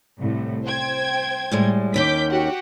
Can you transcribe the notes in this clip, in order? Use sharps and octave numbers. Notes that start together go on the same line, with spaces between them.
C2 A2
C5 G5 G#6
A2 G3 G#3
D#2 D#3 C#4 D6 G6 B6
F#4 G4 F#5